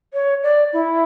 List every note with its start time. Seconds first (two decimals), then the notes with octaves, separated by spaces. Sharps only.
0.14 C#5
0.43 D5
0.73 E4